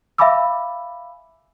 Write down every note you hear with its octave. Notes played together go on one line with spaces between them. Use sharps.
E5 F5 G#5 B5 D6 E6